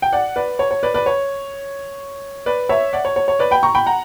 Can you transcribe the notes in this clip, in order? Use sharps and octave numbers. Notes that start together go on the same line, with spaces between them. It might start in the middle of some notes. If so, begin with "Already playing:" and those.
G5
D5 F#5
B4 D5
C#5
C#5
B4 D5
B4 D5
C#5
B4 D5
C#5 E5
D5 F#5
C#5
C#5
C#5
B4 D5
G5 B5
A#5 C#6
G5 B5
F#5 A#5